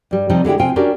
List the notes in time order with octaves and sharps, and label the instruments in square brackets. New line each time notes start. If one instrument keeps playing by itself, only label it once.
[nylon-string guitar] G2 G3
C3 F3 G3 D#4
D3 G#3 E4 G4
C3 F4 G5 G#5
C#4 D4 F#4 G4 A#4